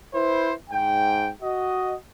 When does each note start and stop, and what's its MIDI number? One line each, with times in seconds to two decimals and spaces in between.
0.13 0.52 64
0.13 0.52 71
0.13 0.52 72
0.70 1.29 44
0.70 1.29 79
1.42 1.94 66
1.42 1.94 75